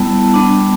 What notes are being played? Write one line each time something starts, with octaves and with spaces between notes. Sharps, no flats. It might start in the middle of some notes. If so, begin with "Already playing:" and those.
Already playing: G3 B3 E4 A5
G3 B3 D4